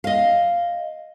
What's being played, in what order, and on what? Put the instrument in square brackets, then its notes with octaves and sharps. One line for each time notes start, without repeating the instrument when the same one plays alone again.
[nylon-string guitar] D#5 F5